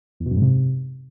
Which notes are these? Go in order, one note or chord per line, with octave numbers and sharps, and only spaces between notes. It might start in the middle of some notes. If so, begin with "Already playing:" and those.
E2
B2
F#2
G#2
C3